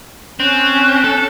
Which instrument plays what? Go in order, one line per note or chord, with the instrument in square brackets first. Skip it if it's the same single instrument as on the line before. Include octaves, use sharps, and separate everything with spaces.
[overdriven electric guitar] C4 [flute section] C#4 F#6
[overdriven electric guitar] A4